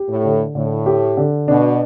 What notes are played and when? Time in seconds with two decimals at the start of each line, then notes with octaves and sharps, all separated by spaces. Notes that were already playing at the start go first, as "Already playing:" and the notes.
Already playing: G4
0.09 A2
0.24 D3
0.55 A2 D3
0.86 G4
1.17 D3
1.48 B2 D4